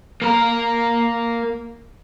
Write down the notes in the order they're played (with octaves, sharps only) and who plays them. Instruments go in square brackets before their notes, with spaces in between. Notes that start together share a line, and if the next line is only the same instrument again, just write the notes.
[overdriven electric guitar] A#3 A#4